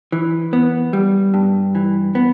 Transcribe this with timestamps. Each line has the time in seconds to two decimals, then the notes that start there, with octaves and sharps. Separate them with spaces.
0.12 E3
0.53 B3
0.93 G3
1.34 G2
1.75 E3
2.15 B3